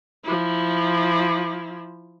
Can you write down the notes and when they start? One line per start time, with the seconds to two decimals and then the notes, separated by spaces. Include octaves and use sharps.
0.25 F3 E4